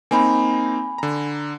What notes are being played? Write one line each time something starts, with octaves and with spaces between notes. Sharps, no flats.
A#3 C4 D#4 G#5 B5
D3 A#5